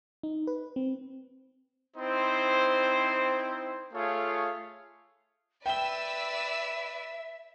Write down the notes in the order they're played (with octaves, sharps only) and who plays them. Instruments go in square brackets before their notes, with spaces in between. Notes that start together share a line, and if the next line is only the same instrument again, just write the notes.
[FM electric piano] D#4
B4
C4
[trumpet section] C4 D#4 E4 C5
A3 F4 G#4 C#5 F5
[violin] B4 D5 [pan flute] E5 [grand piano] G5 G7 [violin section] E6